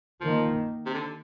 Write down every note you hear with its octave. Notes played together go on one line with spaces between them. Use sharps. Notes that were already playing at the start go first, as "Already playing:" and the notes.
D#3 F3 A#3
C3
D3